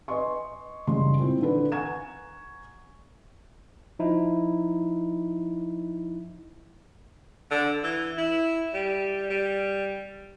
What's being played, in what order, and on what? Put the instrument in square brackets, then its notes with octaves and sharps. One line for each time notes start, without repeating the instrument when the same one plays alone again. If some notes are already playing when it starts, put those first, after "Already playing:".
[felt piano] B4 D#5 G#5 C6 C#6
F#1 C#3 G3 G#3 C6
A#2 C4 E4
D3 E3 D4 A4 B4
F#5 G#5 A#5 C#6 G#6 E7
[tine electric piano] F3 D#4 E4
[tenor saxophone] D3
E3
E4
G3
G3